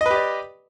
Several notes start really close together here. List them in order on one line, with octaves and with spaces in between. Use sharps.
D#5 B4 G4 D5